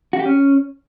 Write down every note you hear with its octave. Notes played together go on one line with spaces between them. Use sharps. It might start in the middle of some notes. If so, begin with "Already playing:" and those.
F#4
G4
C#4